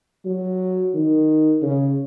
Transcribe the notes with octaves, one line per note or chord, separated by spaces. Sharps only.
F#3
D#3
C#3